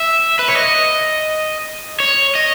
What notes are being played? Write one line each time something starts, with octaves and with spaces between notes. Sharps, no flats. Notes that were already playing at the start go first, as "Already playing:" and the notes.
Already playing: E5
B4
C#5
D#5
C#5
D#5